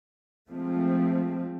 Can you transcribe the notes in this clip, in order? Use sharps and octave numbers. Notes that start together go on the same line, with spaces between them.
F3 G#3 A3 C4